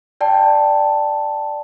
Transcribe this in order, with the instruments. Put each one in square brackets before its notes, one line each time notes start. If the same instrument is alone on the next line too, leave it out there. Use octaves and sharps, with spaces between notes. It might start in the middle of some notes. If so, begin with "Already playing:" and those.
[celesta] D5 G5 A5